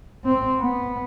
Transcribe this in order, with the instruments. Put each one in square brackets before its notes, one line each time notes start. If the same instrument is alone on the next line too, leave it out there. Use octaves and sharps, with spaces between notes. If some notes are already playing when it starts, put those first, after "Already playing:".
[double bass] C4
B3